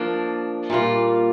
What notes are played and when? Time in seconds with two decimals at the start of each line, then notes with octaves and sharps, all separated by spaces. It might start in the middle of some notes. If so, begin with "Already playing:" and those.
Already playing: F3 A#3 D4
0.70 A#2 G3 A#3 F4